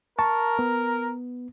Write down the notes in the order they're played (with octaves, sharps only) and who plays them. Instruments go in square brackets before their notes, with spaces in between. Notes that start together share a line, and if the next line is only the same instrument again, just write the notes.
[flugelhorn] A#4 [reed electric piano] A5 C#6
[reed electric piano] B3